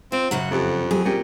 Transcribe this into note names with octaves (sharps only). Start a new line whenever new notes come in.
C4 F4
F#2 C#3 F#3 F#5
F2 C#4 G4 A4
F#3 G4 G#4
A#2 C4 C#4 G4